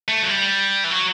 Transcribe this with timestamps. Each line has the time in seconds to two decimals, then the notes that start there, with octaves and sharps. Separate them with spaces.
0.08 A3
0.22 F#3
0.29 G3
0.84 E3
0.91 F#3